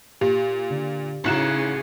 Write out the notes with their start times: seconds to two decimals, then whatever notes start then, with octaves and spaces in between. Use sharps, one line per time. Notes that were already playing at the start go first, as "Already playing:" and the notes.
0.21 A#2 G4
0.70 D3
1.24 A1 C#3 D#4 E4 F#4 G#4 A#5 E7